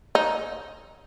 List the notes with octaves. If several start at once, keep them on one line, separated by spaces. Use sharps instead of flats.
D#4